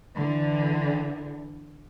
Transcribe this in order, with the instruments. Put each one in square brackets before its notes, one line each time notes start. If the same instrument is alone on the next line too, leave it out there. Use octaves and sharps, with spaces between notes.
[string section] D3 E3